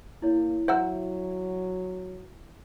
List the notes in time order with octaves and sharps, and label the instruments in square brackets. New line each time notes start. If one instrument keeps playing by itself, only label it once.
[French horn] A#3 [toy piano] E4 C#5
[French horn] F#3 [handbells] C5 F#5 E6 [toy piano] E5 A#5